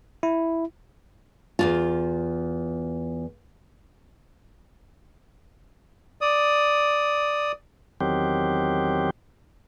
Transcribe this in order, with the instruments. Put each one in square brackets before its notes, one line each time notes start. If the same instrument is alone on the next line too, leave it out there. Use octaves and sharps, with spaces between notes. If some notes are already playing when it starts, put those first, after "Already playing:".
[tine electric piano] E4
[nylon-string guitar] E2 G2 F4
[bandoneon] D5 D#6
[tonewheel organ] E2 D#3 F#3 C4 G4